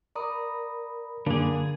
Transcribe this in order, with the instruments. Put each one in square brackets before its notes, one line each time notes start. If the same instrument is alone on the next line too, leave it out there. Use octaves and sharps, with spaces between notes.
[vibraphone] A#4 B5 [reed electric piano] D5 A#5 D#6
[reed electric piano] F#2 A#3 D4 [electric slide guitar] D3 G#4